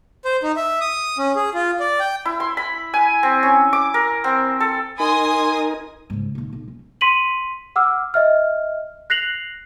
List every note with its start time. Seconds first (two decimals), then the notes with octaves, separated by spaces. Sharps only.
0.25 C5
0.43 D#4
0.57 E5
0.81 D#6
1.18 C#4
1.36 G#4
1.54 F4
1.80 D5
2.00 G5
2.25 E4
2.40 C6
2.57 B5
2.94 G#5
3.23 C4
3.43 C#4
3.73 D6
3.94 A#4
4.24 C4
4.60 A4
5.00 D#4 A#4 G#5 C6 D#6
6.10 G#2 C#3
6.35 D#2 A#2
6.53 B1
6.68 C#4
7.01 C6 B6 D#7 F#7
7.76 F#5 D6 E6 F6
8.14 D#5 E5 F6
9.10 F#6 A#6 C7 F7 F#7